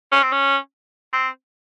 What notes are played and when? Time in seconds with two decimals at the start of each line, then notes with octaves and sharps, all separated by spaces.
0.12 C#4
0.23 C4
0.32 C#4
1.13 C4